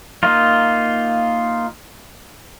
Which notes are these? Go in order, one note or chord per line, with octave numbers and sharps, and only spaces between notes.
A#3 D#4 F4